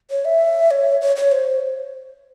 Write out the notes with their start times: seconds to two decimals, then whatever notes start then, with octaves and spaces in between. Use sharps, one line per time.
0.11 C#5
0.25 E5
0.71 C#5
1.01 C#5
1.16 C#5
1.32 C5